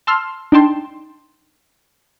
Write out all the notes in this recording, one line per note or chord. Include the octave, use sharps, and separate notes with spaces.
A5 C6 E6 F6
D4 D#4 G5 A5 C6